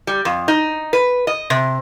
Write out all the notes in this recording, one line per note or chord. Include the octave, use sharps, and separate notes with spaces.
G3
F2
D#4
B4
D#5
C3